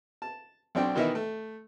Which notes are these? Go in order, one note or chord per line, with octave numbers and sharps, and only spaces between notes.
A5
B1 C4 D4 G5
B2 D#3 E3 D#4 E4
A3